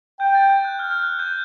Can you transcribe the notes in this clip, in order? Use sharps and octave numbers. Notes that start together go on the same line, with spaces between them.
G5 G6
A6
G6
F#6
F6
F6
F#6
G6